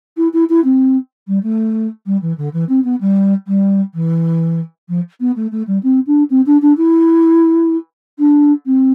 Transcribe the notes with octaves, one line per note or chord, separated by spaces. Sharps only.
E4
E4
E4
C4
G3
A3
G3
E3
D3
E3
C4
B3
G3
G3
E3
F3
B3
A3
A3
G3
C4
D4
C4
D4
D4
E4
D4
C4